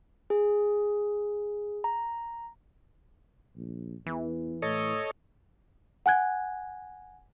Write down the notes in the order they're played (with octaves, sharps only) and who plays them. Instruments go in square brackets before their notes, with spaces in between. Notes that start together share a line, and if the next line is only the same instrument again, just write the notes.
[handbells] G#4
A#5
[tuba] A#1
[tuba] E2 [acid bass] E3
[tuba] A2 [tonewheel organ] A4 C#5 D#5
[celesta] F#5 G#5 F#6 G#6